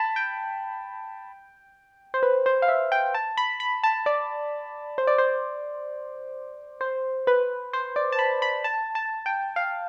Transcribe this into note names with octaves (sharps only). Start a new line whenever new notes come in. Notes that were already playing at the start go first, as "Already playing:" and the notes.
Already playing: A5 B5
G5
C5
B4
C5
F5
E5
G5
A5
B5
B5
A5
D5
C5
D5
C5
C5
B4
C5
D5
A5
B5
B5
A5
A5
G5
F5